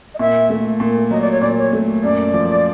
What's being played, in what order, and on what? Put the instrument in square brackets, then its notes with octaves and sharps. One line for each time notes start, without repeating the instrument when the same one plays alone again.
[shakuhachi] D#5
[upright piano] A#2 [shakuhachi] E5
[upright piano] A3
A#2
[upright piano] F#3 [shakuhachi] D#5
[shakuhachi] D5
C#5
[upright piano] A#2 [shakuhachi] D5
[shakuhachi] C#5
[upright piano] A3
[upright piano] F#2 [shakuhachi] D5
[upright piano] F3